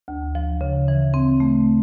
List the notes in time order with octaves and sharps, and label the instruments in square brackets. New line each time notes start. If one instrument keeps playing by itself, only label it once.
[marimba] D2
F3
C#3
E3
C4
A3